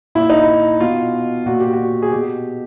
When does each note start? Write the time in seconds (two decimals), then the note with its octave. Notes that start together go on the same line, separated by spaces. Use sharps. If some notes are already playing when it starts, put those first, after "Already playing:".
0.15 A#2 E4
0.30 D#4
0.43 E4
0.80 B2 F4
1.46 A#2 F#4
1.60 G4
1.73 F#4
2.02 G#4
2.11 B2 G4